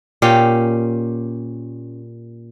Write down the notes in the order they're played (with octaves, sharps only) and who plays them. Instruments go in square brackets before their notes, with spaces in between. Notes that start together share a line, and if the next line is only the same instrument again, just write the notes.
[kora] A#2 C#4 G4 F5